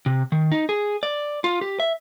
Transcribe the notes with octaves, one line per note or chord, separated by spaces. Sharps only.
C3
D#3
D#4
G#4
D5
F4
G4
E5